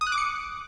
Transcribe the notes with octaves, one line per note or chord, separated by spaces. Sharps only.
D#6
F#6
D6
C#7